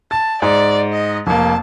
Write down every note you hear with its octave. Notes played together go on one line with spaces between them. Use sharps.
A5 A6
G#2 D5
D#5
F1 A#3 A5